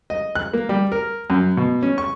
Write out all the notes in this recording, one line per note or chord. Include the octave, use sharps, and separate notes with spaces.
D#5
F#6
A#3
G3
A#4
F#2
B2
C#4
C#6